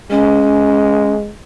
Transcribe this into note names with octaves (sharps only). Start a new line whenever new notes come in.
G#3 C#4